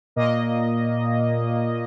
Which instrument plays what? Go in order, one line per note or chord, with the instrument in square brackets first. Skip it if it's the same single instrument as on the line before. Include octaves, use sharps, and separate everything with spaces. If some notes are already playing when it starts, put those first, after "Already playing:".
[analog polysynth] A#2 A#3 D#5